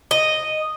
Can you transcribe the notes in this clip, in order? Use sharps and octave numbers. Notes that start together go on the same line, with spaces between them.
D#5